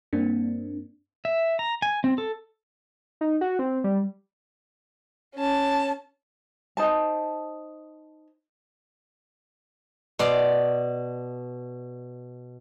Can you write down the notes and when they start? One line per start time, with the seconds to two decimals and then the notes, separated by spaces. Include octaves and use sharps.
0.13 G2 A#3 C4 D4
1.25 E5
1.59 A#5
1.82 G#5
2.04 C4
2.18 A4
3.21 D#4
3.41 F#4
3.59 C4
3.84 G3
5.35 C#4 A5
6.77 D#4 C5 A5
10.19 B2 D5 C6